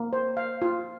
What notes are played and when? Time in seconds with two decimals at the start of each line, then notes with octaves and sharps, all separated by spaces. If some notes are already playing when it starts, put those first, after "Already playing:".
Already playing: A#3
0.13 C5
0.37 F5
0.62 F4